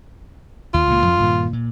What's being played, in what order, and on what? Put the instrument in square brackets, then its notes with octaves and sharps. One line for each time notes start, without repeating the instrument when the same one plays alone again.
[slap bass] D#2 [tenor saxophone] F4
[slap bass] C#2 A#2 A#3
F2 F3
G2 A#2 D#3
A#2